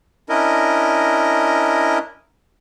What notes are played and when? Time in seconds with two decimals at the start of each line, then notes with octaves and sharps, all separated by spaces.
0.29 C#4 D4 E4 A#4 D#5